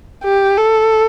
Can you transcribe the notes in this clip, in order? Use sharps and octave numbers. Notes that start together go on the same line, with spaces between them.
G4
A4